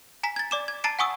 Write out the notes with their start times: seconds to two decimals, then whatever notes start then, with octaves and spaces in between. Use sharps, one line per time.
0.23 G#5 A#5 B6
0.36 G#6 A6
0.51 D5 D6 E7
0.68 G#6
0.84 A5 A#5 A6 C7 D7
0.99 F#5 G#5 C#6 D#6 E6